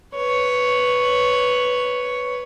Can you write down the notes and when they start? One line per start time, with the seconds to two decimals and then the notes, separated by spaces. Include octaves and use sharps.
0.16 B4 C#5